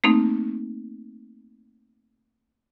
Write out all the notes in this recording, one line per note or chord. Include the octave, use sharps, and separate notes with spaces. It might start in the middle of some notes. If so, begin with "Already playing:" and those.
A3 A#3 C4 D#4